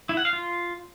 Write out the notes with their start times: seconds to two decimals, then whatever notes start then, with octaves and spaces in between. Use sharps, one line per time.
0.09 E4
0.17 F#5
0.25 F5
0.33 F4